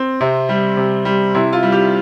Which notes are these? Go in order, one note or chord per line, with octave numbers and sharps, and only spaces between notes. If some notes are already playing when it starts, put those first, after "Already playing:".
Already playing: C4
C3
G3
C3
G3
C3 E4
F4
G3
G4